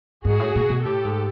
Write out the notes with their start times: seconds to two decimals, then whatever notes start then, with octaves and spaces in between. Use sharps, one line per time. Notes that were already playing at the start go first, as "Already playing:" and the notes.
0.25 G#2 F#4 G#4
0.40 A2
0.55 A#2
0.69 B2
0.85 A2 G4 A4
1.05 G#2